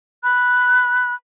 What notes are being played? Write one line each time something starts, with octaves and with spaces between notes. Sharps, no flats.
B5 F#6